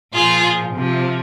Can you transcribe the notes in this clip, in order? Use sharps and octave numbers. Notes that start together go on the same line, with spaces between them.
A#2 F3 F4 G#4
C3 F3